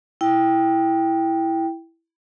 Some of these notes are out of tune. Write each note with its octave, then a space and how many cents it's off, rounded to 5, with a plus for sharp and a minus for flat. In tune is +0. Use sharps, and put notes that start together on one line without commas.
E4 +0 G5 +0